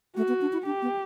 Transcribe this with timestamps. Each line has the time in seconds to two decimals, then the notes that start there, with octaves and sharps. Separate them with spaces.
0.17 A3 F#4
0.28 B3
0.41 D4
0.53 E4
0.65 D4 G4
0.82 B3